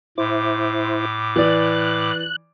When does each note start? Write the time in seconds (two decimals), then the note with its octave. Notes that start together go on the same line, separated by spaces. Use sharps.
0.18 A2 E4 C5 D6
1.36 E3 D5 F#6